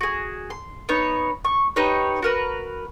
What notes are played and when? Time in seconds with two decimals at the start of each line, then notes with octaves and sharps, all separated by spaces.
0.01 F#4 G#4
0.50 C6
0.89 B3 D#4 C#5
1.44 C#6
1.76 D#4 G4 B4 C#5
2.22 F#4 A#4 B4